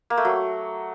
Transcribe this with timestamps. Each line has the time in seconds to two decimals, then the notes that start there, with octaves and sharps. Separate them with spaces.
0.10 A#3
0.17 A3
0.25 F#3